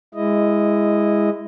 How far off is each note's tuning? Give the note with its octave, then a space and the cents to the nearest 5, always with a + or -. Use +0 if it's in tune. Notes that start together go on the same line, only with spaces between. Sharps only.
G#3 -15 E4 +0 D#5 +0